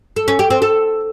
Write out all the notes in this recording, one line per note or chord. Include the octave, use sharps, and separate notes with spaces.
A4
C#4
G4
C4
A4